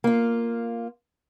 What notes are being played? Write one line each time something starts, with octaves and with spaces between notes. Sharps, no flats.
A#3 F4